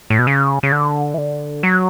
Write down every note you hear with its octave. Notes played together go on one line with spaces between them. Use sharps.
A2
B2
C#3
C#3
D3
E3
D3
F#3